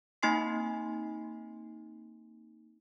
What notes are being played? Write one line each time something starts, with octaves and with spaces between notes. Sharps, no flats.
A#3 C4 D#4 G#5 C6 C7